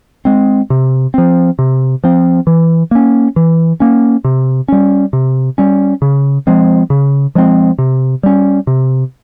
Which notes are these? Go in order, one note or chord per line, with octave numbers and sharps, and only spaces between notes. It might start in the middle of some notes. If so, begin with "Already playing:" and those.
G#3 C4
C3
F3 C4
C3
F3 C4
E3
A#3 C#4
E3
A#3 C#4
C3
G3 C#4
C3
G3 C#4
C#3
F3 G#3 C4
C#3
F3 G#3 C4
C3
G3 C#4
C3